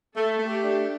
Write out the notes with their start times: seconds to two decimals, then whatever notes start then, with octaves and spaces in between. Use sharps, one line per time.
0.16 A3 A4
0.39 A3
0.46 G4
0.62 D4